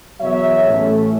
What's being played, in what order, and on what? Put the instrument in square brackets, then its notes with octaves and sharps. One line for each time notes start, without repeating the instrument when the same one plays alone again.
[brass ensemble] E2 B2 F#3 C#5 E5
A1 A2 E3 A3 C#4